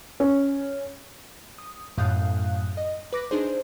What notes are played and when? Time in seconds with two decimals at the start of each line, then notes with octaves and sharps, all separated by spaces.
0.20 C#4
1.58 D#6
1.98 F#2 A2 F5 D#6 F#6 G6
2.77 D#5
3.13 B4 D6 A#6
3.31 D4 D#4 G#4 C5